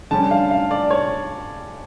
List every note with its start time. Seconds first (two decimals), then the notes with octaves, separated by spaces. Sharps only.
0.11 D3 G3 C#4 A5
0.31 F5
0.51 F5
0.71 D5
0.91 C#5